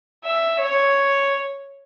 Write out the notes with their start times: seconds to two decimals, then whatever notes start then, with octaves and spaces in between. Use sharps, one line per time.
0.24 E5
0.60 C#5